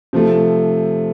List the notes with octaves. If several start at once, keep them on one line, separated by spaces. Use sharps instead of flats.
C3 F3 A3